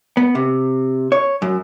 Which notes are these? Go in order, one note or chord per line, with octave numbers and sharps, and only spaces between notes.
B3
C3
C#5
F#2